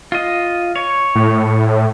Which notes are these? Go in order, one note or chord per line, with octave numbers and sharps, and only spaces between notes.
F4 D#5
C#5
A2